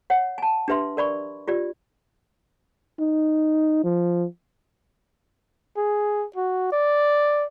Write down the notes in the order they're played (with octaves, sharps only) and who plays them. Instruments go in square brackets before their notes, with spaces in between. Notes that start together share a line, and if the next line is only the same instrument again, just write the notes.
[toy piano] C#5 F#5
G#5 A5
D4 G4 B4 E5 C6
A#4 D5 B5 C#6
F4 G4 D5
[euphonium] D#4
F3
[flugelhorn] G#4
F#4
D5